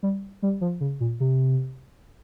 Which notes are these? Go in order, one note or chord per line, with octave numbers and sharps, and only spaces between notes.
G3
G3
F3
C#3
A#2
C3